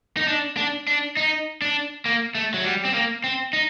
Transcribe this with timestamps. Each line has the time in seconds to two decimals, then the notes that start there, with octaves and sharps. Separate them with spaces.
0.17 D#4
0.28 D4
0.57 D4
0.88 D4
1.17 D#4
1.62 D4
2.06 A#3
2.35 A3
2.54 F#3
2.64 G3
2.85 C4
2.94 A#3
3.24 C4
3.53 D#4